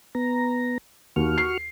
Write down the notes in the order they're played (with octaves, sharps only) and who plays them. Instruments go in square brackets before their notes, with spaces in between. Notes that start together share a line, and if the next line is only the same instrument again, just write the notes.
[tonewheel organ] B3 A#5
[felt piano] D#2 [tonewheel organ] F#4 C#6 F6
[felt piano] C7